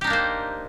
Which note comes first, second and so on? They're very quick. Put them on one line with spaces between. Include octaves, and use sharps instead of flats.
G4 D#4 D4 A#3 C5